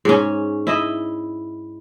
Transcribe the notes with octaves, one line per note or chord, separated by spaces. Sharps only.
G#2 C#4
E4 D#5 E5